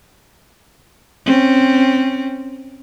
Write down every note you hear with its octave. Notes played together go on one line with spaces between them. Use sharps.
C4 C#4